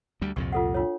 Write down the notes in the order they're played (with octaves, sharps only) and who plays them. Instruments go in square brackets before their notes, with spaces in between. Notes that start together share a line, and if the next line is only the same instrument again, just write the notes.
[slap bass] D2 G3
[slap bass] C2 F2 A#2 [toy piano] C#6
[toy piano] F4 A4 F#5
D4 F4 C#5